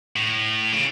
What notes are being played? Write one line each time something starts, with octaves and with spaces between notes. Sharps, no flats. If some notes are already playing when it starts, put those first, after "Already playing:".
A2
C#3